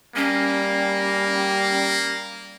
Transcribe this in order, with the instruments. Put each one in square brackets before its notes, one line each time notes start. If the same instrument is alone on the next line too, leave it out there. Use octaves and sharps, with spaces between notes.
[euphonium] G3 [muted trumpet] A#3 [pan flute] C#4